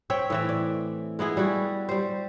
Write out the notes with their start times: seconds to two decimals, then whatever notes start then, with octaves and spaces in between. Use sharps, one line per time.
0.10 C4 C#5 E5 G5
0.30 A2 E3 E5
0.49 D5
1.19 G#3 B3 E4 G#4
1.37 G3 F#4
1.89 G3 C5